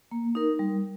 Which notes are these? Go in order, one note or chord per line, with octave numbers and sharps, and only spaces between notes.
A#3
D#4 A#4
G3